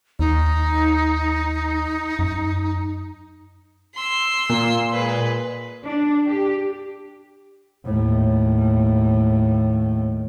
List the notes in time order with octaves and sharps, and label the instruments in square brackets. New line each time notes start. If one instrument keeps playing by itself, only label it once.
[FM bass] D#2 [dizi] D#4
[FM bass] F#2
[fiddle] C6 E6
[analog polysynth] A#2
[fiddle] G#3 B4
[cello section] D4
G4
[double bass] D#2 A2